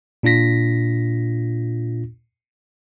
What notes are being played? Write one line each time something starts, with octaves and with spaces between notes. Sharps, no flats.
A#2 D4 F4 A#6 B6